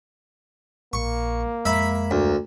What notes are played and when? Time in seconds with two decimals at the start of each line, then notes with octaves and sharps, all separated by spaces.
0.93 A#1 A#3 C#6
1.65 F2 G#3 E5 A#5 B5
2.11 D2